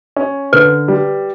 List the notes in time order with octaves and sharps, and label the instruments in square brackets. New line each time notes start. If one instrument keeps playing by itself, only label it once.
[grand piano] C#4
[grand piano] D3 [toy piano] B4
[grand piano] G3